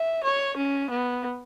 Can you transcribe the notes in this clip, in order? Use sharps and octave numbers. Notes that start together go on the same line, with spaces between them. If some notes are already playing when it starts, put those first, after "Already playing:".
Already playing: E5
C#5
C#4
B3